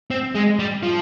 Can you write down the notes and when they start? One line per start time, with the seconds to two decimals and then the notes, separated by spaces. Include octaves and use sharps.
0.11 C4
0.35 G#3
0.59 G3
0.83 F3